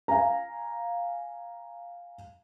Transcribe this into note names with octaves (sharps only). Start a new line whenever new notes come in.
F5 G#5 A#5